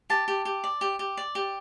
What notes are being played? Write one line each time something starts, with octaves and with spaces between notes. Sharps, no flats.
G4 A5
G4
G4
D5
G4
G4
D5
G4